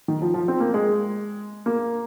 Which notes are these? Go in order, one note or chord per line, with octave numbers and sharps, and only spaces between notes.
D#3
F3
F3
C4
A#3
G#3
A#3